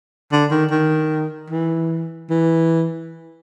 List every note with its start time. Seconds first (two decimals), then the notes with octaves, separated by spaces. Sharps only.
0.32 D3
0.51 D#3
0.71 D#3
1.50 E3
2.30 E3